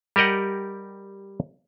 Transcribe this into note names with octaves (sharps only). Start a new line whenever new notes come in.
G3 G4 A#4 D#5 F#5